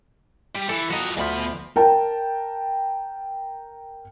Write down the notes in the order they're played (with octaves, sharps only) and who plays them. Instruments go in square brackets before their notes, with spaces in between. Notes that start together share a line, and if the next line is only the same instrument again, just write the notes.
[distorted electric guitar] G3
[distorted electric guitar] E3 [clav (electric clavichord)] A4
[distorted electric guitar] F3 D#5 [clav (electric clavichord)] F#4 A#5
[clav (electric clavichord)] D2 F3 [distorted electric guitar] B2 B5
[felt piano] A#4 G5 A5